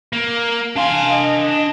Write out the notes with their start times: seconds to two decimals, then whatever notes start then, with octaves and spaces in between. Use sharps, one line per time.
0.13 A#3
0.76 D4 F5 G#5 C6
1.13 D#5